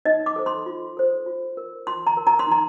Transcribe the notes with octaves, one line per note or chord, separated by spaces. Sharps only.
D#4 D#5
D6
A4 C5
C6
F4
A4 C5
F4
A#4
F4 C6
A#5
A#4
A#5
C6
D#4 A#5